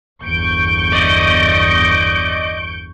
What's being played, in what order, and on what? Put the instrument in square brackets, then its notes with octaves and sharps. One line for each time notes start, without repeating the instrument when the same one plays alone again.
[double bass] G1 E2 [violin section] C#6 G6 D7
[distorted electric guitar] D5 D#5